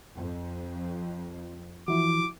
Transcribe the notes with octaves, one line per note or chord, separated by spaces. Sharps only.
F2
E3 F3 E4 F#4 D6